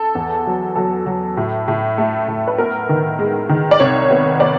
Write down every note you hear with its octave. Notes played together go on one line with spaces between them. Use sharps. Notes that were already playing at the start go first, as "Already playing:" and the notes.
Already playing: A4
E2
F#3
F#3 A4
F#3
A2
A2
A3
A2
B4
B3 A#4
D#3
G#3
D#3
D5
C2 C#5
B3
B3 D5